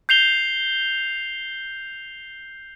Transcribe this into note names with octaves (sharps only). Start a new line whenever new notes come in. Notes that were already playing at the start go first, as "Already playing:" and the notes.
G6 C7 F7 G7